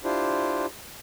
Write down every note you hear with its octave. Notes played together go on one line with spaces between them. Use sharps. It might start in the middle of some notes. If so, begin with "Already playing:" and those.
D4 E4 F4 G4 C5